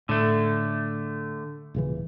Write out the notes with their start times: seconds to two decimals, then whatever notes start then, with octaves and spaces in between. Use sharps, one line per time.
0.09 A2 D3 A3
1.74 D#1 C#3 E3